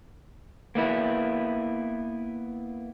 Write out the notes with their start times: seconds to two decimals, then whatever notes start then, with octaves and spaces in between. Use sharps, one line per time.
0.75 A#3 B3 E4